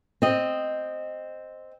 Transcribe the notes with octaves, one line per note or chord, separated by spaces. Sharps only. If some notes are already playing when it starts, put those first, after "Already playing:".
C4 D#5